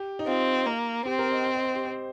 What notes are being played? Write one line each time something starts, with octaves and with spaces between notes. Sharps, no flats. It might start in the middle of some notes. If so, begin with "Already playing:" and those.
Already playing: G4
D#4
C4 F4
A#3
C4 G4
A#4
D#5
G5
D#5
C5
G4
C5